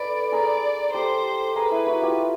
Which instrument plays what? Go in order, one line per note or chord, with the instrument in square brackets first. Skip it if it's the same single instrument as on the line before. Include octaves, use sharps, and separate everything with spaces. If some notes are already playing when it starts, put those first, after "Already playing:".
Already playing: [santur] A4 B4 [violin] D5
[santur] G#4 A#4 [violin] D5
[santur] G4 A4 [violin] C5
[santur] G#4 A#4 [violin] B4
[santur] E4
E4 F#4
F4 G4